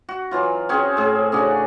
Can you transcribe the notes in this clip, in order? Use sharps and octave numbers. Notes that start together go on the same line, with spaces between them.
F#4
E3 F#3 F4
C4 C#4 F#4 G#4
A2 G#4
C#3 D4 F#4